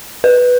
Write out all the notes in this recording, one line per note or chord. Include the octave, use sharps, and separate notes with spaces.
B4